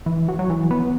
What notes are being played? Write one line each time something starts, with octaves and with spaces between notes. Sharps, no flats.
E3
F#3
F#3
E3
B3